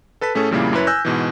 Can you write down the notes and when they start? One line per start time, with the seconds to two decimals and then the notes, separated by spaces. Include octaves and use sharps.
0.21 A4 B4 A5 B6
0.35 A2 A3 C#4 G#4 A4
0.51 F2 A#2 C#3 G3 A#3 E4
0.73 F#2 E4 B4 C#5
0.87 G#5 E6 F#6 G6 A#6
1.05 G#2 B2 E3